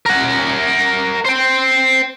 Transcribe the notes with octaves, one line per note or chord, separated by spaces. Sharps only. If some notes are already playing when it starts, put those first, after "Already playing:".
A#4 F#5
C5 G5